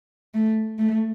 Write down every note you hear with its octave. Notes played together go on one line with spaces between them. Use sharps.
A3
A3